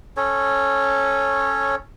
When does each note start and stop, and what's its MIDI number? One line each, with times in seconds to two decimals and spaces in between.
0.17 1.75 61
0.17 1.75 69
0.17 1.75 73